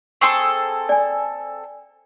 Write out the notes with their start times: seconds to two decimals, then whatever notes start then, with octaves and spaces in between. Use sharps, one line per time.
0.21 C4 G#4 A4 C6 C#6
0.89 D5 G#5